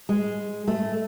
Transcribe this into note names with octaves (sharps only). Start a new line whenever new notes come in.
G#3
A3